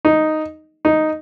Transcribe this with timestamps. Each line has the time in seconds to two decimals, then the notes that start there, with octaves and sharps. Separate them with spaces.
0.05 D#4
0.85 D#4